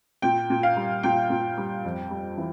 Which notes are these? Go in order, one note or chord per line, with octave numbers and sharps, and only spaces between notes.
A#2 G5
A#2
F5
G3
A#2 G5
A#2
G3
F2
G3
E3